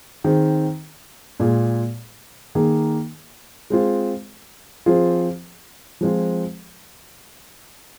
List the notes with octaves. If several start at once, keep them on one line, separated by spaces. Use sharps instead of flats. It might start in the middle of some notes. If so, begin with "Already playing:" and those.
D#3 C4 G#4
A#2 G#3 F4 G#4
D#3 A#3 G#4
G#3 C4 F4 G#4
F3 C4 F4 G#4
F3 G#3 C4 F4 G#4